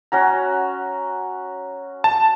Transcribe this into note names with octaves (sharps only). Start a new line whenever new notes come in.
C#4 F#4 A#5
A5